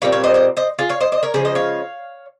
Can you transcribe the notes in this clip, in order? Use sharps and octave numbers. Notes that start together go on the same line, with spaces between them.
A#2 G3 C4 C#5 F5
C#5 F5
C5 D#5
C5 D#5
C5 D#5
F4 G#4
C#5 F5
C5 D#5
C5 D#5
A#4 C#5
C#3 F3 G#3 G#4 C5
C5 D#5
C#5 F5